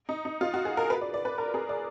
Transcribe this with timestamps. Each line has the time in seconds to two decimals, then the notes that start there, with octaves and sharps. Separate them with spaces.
0.09 D#4
0.25 D#4
0.41 F4
0.54 F#4
0.65 G#4
0.77 A#4
0.90 B4
1.01 D5
1.14 D5
1.25 B4
1.38 A#4
1.54 G#4
1.69 D5